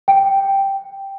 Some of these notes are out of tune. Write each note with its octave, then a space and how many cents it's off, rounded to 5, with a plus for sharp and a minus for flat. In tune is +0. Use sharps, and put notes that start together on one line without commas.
G5 +0